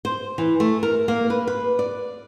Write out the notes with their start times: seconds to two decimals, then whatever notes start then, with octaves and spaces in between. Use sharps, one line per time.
0.05 C5
0.38 E3
0.60 A3
0.83 A#4
1.08 A#3
1.30 B4
1.47 B4
1.79 D5